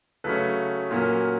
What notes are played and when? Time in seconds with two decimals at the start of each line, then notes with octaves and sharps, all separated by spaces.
0.24 C#3 F#3 A3 C#4 A4 B4
0.91 A#2 F#3 A#3 C#4